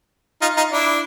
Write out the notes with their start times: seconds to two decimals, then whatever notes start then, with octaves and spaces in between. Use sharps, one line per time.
0.42 D#4 F4
0.57 D#4 F4
0.72 D4 E4